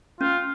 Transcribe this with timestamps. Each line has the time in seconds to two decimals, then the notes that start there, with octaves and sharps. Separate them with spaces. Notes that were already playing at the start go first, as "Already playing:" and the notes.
0.21 C#4 F4